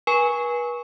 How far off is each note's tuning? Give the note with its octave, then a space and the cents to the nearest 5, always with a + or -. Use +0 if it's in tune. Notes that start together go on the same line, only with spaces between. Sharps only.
B4 -40 G#5 +0 C#6 +0